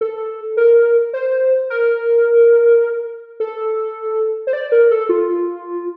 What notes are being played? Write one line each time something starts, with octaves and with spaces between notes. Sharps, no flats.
A4
A#4
C5
A#4
A4
C5
D5
A#4
A4
F4